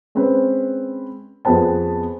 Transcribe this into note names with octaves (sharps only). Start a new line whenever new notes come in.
G#3 C4 C#4 B4
F2 B3 G#4 B4 A5